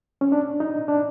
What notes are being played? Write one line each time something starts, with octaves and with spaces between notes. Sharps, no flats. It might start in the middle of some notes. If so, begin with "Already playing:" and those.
C#4
D4
D#4
D4